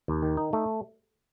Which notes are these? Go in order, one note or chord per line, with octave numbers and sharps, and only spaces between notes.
D#2
D#3
D#4
A3